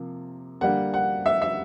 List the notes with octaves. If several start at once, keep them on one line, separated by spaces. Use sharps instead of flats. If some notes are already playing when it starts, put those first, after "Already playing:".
Already playing: C3 F3 A#3
D3 G3 A#3 F#5
F#5
E5
E5